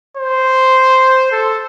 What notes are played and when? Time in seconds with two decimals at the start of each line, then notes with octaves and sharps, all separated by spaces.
0.17 C5
1.32 A4